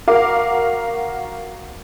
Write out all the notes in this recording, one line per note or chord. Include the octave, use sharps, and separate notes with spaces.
F#4 A#4 F5 D6